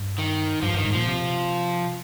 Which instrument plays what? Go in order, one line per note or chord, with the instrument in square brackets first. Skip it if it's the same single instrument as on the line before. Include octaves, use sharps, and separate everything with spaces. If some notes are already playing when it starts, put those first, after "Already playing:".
Already playing: [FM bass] G2
[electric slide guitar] D#3
[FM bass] G2 [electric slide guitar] F3
[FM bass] G2 [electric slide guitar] D#3
[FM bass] G#2
[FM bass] A#2 [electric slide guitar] F3
[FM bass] C3